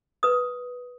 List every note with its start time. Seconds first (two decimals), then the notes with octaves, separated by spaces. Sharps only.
0.23 B4 D#6